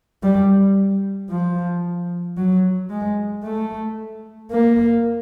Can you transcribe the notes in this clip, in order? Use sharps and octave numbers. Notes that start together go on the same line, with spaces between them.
G3
F3
F#3
G#3
A3
A#3